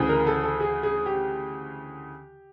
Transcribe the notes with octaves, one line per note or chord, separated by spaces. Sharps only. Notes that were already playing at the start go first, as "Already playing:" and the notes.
Already playing: D2 C#3 E3
A#4
A4
A4
G#4
G#4
G4